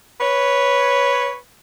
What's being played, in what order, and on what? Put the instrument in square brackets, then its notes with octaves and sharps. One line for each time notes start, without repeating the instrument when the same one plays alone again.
[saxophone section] B4 C#5